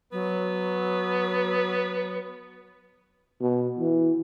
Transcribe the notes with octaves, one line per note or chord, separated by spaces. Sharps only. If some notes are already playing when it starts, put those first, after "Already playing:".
F#3 B3
B2
E3